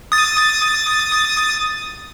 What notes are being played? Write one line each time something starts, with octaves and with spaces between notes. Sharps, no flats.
D#6 A6